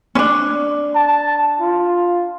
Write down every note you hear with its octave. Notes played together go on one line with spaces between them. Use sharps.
C#4 D4
A5
F4